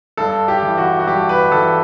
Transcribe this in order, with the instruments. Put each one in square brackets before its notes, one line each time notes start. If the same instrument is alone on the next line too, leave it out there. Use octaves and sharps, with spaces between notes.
[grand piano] G2 A4
G4
E3
F#4
F#4
G2 G4
B4
E3 A4